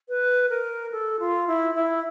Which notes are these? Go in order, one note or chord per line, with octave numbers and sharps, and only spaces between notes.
B4
A#4
A4
F4
E4
E4